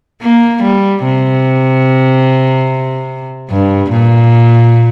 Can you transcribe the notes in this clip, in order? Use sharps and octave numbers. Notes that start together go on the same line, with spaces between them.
A#3
G3
C3
G2
A#2